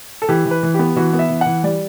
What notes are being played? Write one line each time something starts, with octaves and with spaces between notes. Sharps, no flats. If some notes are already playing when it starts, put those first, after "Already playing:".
A4
E3 G4
E3
B4
E3
B3 G4
E3 F#4
B3
E5
E3
E3 F#5
G3 D5